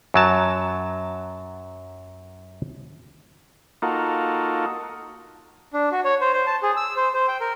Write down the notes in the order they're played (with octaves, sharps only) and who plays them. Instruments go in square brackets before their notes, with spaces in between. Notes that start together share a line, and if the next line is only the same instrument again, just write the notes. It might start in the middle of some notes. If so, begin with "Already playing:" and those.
[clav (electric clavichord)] F#2 F#3 A5
[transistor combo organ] A#3 D#4 F4 F#4 A4
[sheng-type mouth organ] D4
F#4
C#5
C5
C5
A5
G#4
E6
C5
C5
G5
A#4